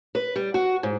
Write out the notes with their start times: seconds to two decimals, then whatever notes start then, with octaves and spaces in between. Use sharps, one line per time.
0.15 B4
0.36 G3
0.54 F#4
0.83 G#2